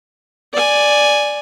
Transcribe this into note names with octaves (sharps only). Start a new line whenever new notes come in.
D5 G#5